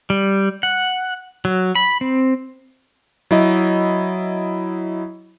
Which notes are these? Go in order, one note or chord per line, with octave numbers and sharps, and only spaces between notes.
G3
F#5
F#3
B5
C4
F#3 E4 D#5